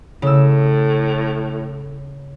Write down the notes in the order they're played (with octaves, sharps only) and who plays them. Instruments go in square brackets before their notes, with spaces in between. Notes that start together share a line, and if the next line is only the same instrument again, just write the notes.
[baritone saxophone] A2 [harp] C#3 E6